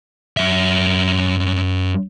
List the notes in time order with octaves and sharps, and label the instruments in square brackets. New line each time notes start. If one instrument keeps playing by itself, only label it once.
[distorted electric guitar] F#2 E5